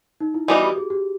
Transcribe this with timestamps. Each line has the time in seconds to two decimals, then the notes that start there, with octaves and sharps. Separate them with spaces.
0.20 D#4
0.34 E4
0.48 E3 G3 B3 D#4 F#4
0.63 G4
0.78 G#4
0.90 G4